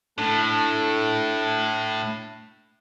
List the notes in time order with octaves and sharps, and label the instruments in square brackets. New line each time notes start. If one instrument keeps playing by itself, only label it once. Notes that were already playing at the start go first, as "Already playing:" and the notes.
[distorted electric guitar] A2 [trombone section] A3 [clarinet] D4